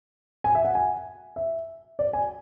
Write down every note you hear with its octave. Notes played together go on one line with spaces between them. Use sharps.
G#5
E5
F#5
G#5
E5
D5
G#5